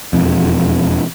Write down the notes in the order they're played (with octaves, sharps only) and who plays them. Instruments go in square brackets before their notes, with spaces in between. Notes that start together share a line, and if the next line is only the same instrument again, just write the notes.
[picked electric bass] E1 F2